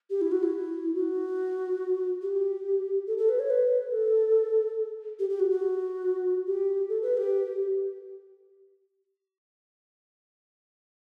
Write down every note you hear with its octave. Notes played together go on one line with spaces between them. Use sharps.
G4
E4
F#4
E4
F#4
G4
A4
A4
B4
C#5
B4
A4
G4
G4
F#4
F#4
G4
A4
B4
G4